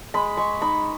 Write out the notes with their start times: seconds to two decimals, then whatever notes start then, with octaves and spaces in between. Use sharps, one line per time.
0.14 G#3 B5
0.37 G#3 C#6
0.62 D#4 B5